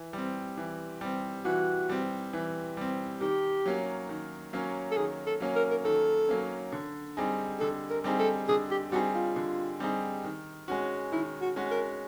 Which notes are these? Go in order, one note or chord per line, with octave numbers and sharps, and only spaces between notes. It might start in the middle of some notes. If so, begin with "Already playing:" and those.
Already playing: E3
G3 C4
E3
G3 C4
E3 F#4
G3 C4
E3
G3 C4
D#3 G4
F#3 A#3 C#4
D#3
F#3 A#3 C#4
A4
D#3 G#4
A4
F#3 A#3 C#4
A#4
A#4
D#3 A4
F#3 A#3 C#4
D3
G3 C4 D#4 G#4
D3 A4
A#4
G3 C4 D#4 G#4
A4
D3 G#4
G4
G3 C4 D#4 F#4 G#4
F4
D3
G3 C4 D#4 G#4
D#3
G#3 C#4 F#4
D#3 E4
F#4
G#3 C#4 F#4
A#4